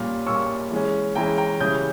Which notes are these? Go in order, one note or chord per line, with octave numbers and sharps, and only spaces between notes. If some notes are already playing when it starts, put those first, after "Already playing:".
Already playing: A#2 G3 A#3 C#4
A#2 G3 A#3 C#4 C#6 E6
E3 G#3 C#4
E3 G#3 C#4 G5 A#5
G5 A#5
C#3 E3 G3 C#4 D#6 G6